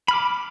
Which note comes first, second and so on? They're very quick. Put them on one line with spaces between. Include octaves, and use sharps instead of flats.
B5 F6 D6